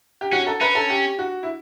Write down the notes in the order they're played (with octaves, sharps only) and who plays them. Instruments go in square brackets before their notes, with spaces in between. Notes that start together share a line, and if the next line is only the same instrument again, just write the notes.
[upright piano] G4
[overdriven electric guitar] C#4 [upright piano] F#4
[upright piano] A4
[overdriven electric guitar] C#4 [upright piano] B4
[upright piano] A4
G4
F#4
E4